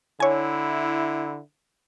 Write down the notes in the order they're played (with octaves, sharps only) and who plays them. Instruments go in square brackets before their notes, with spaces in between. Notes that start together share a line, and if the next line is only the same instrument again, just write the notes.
[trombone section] D3 E4 [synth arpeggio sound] C#5 G#5